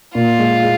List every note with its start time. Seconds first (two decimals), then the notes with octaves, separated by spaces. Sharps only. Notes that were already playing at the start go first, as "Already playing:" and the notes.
0.15 A#2 F4
0.39 G#3
0.62 G#3